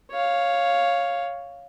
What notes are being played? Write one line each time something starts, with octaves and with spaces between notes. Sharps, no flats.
C#5 F5